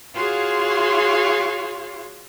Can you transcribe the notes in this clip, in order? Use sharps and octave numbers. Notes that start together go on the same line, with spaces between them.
F4 F#4 G#4 C#5 F5 C6